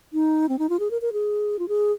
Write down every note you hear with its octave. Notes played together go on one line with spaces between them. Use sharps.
D#4
C4
D#4
F4
G#4
A#4
A#4
G#4
F4
G#4